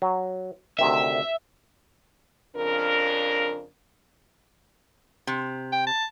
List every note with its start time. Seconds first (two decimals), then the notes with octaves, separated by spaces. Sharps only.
0.02 F#3
0.79 D2 C3 D#3 E5
2.56 F2 C#3 D4 A#4
5.27 C3
5.72 G5
5.87 A5